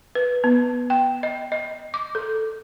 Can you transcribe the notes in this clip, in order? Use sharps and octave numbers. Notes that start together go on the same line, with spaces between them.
B4
B3
G5
D#5
D#5
D6
A4